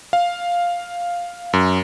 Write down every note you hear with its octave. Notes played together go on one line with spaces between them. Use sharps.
F5
F#2